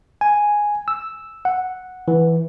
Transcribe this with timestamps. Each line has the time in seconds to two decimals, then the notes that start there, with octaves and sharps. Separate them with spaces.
0.21 G#5
0.88 E6
1.45 F#5
2.08 E3